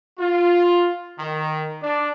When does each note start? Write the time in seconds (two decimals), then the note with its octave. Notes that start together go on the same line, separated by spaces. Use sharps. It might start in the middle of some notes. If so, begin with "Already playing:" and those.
0.19 F4
1.19 D#3
1.83 D4